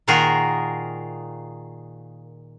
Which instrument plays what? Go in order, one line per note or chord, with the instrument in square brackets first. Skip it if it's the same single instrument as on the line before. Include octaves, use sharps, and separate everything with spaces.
[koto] A#2 D#3 F4 F#4 G#4 A#4